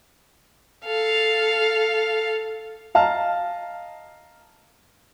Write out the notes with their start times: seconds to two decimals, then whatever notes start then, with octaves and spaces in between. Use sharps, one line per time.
0.85 A4 F5
2.95 D#5 F5 A5 A#5 F6